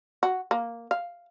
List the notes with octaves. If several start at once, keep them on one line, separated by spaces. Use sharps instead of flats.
F#4
A#3
F5